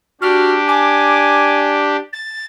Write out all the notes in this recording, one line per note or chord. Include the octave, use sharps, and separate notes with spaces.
D4 F#4 G4 F6
G#5 D6
A6